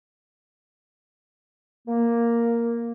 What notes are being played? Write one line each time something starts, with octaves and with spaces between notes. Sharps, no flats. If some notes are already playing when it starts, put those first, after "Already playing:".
A#3